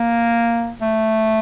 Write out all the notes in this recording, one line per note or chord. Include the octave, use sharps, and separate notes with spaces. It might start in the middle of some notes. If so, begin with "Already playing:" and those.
Already playing: A#3
A3